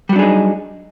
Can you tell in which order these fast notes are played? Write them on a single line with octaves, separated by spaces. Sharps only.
G3 F#3 D4 G#4 D#4